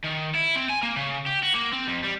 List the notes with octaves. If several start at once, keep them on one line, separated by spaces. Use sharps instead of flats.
D#3
E4
C4
G#5
A#3
C#3
G4
F#4
A#3
C4
F2
G3